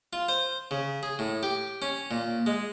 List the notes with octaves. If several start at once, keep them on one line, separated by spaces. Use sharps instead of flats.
F4
C5
C#3
G#4
A2
G4
C#4
A#2
G#3